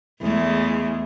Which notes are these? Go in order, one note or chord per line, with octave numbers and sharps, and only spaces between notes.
E2 G#3 A3